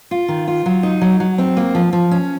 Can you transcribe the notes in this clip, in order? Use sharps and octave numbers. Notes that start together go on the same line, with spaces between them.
F4
D#3
F4
F#3
D#4
F#3
F#3
C4
A#3
F3
F3
C#4